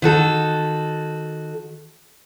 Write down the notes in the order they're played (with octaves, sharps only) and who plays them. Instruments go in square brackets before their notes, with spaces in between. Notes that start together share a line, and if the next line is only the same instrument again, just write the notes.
[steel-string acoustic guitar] D#3 F#4 A4